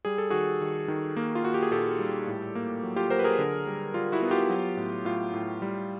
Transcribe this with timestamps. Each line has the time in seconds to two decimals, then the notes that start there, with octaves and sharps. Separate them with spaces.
0.05 G3 G#4
0.18 A4
0.30 D#3 F#4 G#4
0.61 D#3
0.88 D#3
1.17 A#3
1.35 F4
1.44 A#3 F#4
1.54 G4
1.63 G#4
1.72 A#2 G4 A4
1.99 G3
2.27 A2
2.55 A#3
2.83 F#3
2.96 F4 G4
3.10 F#3 A#4 C5
3.19 B4
3.24 G#4 A#4
3.38 D3
3.67 G3
3.94 G3 F4
4.12 E4 F#4
4.22 B3
4.31 F4 G4
4.50 F#3
4.77 A2
5.05 A2 F4
5.34 A2
5.62 G3